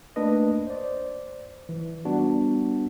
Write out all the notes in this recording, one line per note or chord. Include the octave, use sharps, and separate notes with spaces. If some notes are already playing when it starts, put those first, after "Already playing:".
A3 A#3 D4 B4 D#5
C5 D5
E3
G3 B3 D4 F#4